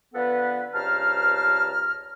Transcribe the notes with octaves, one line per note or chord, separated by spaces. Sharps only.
D3 F3 B3 A4 B4
C#2 G2 C5 A5 A#5 F6